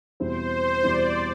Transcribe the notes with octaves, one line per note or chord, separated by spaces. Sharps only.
E2 B2 G3 C4 E4 C5
E2 B2 G3 C4 E4 D5